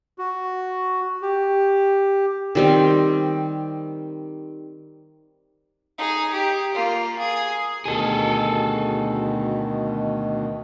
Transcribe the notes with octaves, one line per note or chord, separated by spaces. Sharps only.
F#4
G4
D#3 G3 C4
D#4 G#4
G4
A#3 F4
G#4
D2 B2 D#3 G#4 A4